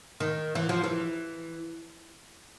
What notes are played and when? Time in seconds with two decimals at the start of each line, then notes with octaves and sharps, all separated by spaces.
0.20 D#3
0.55 E3
0.69 F3
0.84 E3